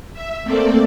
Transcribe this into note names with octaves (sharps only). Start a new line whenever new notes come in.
E5
A3 A#3 C4 A4 D5